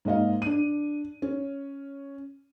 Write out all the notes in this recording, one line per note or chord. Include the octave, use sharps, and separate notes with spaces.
G#2 A#3 D#5 F5
D4 D#7
C#4